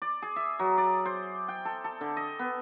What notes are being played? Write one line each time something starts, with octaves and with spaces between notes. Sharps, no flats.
D5
G#4
E5
F#3
D5
C5
G5
A4
A4
D3
D#5
B3